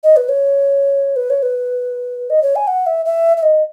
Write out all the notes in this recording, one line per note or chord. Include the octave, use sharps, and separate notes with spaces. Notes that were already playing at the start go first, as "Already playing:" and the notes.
D#5
B4
C#5
B4
C#5
B4
D#5
C#5
G#5
F#5
E5
E5
E5
D#5